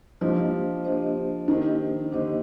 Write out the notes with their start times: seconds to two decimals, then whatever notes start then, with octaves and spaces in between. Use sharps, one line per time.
0.21 F3 A#3 D4 G4 C5 D#5
0.84 A#3 D4 G4 C5 D#5
1.48 D#3 A#3 D4 G4 C5 D#5
2.12 D3 A#3 D4 G4 C5 D#5